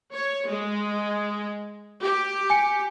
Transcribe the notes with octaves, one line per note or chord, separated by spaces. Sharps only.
C#5
G#3
G4
G#5 C#7